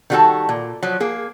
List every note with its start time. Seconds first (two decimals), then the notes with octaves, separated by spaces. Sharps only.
0.10 D#3 G3 A#3 F#4 A4 A5
0.49 A#2
0.83 F3 F#3
1.00 A#3 G#4